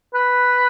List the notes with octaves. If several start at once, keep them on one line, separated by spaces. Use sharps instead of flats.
B4